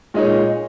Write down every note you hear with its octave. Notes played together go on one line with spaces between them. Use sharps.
A#2 G#3 D#4 G#4 C#5